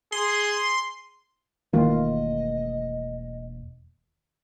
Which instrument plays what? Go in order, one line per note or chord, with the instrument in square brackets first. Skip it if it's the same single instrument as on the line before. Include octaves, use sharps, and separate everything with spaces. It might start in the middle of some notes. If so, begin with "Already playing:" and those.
[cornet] G#4 [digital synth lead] C6
[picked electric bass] E1 A3 A#3 [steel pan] D#3 E3 F4 [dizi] D#5